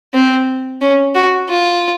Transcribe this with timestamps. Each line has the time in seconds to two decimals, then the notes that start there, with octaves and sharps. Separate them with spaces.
0.14 C4
0.81 C#4
1.14 F#4
1.49 F4